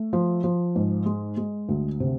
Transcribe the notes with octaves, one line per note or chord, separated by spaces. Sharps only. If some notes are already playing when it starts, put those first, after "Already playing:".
Already playing: A3
F3
F3
G#2
G#3
G#3
D2
C3